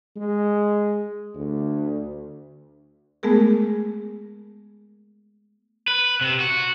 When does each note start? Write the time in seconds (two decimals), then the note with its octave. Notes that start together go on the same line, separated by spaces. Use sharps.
0.16 G#3
1.35 D2
3.23 G#3 A3 B3 G#4 A#4
5.88 B4
6.21 C3
6.40 F#4